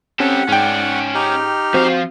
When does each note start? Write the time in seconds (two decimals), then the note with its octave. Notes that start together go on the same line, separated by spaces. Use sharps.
0.20 C4 C#4 G4 A4 F#5
0.48 G#2 C#4 D5 G5
1.15 D#4 G4 F6
1.74 F3 C4 F#4 C5 F5